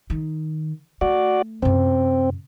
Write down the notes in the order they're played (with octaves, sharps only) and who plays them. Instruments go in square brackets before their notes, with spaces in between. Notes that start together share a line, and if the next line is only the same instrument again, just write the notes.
[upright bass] D#3
[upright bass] A3 [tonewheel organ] F#4 D5
[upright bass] F#2 C3 [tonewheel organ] C4